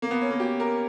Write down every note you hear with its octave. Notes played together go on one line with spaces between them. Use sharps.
A#3
B3
C#4
A#3
G4
A#4